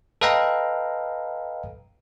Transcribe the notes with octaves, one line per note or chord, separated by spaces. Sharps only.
A4 B4 D#5 F5 G5 A#5